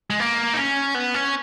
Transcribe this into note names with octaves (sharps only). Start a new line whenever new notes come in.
G#3
A#3
D#4
C#4
B3
C#4